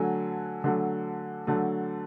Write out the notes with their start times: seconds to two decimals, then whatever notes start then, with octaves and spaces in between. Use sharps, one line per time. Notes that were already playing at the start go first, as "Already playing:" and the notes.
Already playing: D3 F#3 A3 G#5
0.64 D3 F#3 A3
1.47 D3 F#3 A3